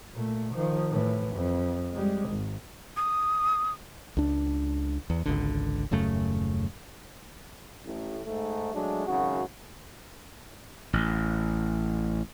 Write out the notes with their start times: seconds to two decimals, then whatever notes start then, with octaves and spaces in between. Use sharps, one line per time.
0.14 A#2 A3
0.55 D#3 F3
0.90 A2 E3
1.36 F2
1.92 G3 G#3
2.30 G#1
2.97 D#6
4.17 C#2 D4
5.10 E2
5.26 G#1 C#2 D3
5.91 D#1 F#2 C#3 A3
7.85 A1 A2
8.25 G#2 A3
8.72 F#3 G#3 A3 D4
9.06 G#1 F#2 C#3 F#4
10.93 A1